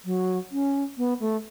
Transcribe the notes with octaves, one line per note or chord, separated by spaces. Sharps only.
F#3
C#4
B3
A3